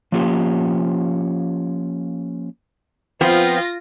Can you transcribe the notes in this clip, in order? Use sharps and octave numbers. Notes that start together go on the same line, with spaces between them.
F3 A#3 C#4 F4 G4
F3 B3 C4 F4 A#6